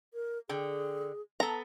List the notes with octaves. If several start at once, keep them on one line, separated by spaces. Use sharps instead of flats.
A#4
D3 G#4 G5
B3 A4 A#5